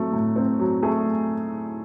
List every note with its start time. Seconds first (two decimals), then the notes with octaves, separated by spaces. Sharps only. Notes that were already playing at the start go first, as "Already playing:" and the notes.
Already playing: F#3 A3 C4
0.12 A2
0.36 C4
0.59 F#3
0.83 A3 G#4